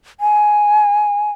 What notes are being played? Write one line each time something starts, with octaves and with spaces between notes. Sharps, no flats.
G#5